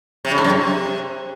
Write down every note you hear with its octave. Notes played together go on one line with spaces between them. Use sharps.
C3
C#3
G#2
F#2
C3